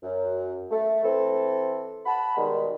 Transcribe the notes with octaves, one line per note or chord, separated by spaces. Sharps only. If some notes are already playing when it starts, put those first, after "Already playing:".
F#2
A3
E3 C4 A4
F#5 A5 B5
B2 D#3 G3 G#3